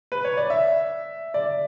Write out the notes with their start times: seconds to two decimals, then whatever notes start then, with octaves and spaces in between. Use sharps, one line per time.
0.12 B4
0.25 C#5
0.37 D5
0.50 E5
1.34 D5